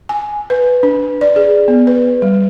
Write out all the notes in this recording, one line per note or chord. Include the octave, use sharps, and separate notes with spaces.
G#5
B4
D4
D5
G#4
B3
B4
G3